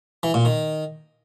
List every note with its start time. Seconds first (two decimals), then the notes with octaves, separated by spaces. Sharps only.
0.23 E3
0.34 A#2
0.45 D#3